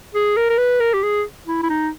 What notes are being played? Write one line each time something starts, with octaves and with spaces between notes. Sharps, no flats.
G#4
A#4
A#4
B4
A#4
G4
G#4
E4
E4
D#4